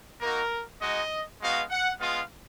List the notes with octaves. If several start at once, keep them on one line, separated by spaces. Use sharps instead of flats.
A#3 D#4 F#4 A#4
G#3 D#4 F#4 D#5
G#3 B3 D#4 F#4 F5
F#5
G#3 B3 F4 F5